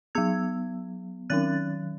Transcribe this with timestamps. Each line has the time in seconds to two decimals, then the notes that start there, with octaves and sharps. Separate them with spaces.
0.15 F#3 B3 E6 G#6
1.30 D#3 F#3 C#4 F#6 A6